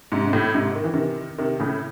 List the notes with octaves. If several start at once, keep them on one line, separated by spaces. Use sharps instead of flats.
G#2 C3
C3
A2
G#2 C3
D#3
E3
C3 D#3
C3 D#3
A2 C#3